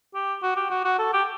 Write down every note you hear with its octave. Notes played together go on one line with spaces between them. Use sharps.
G4
F#4
G4
F#4
F#4
A4
G4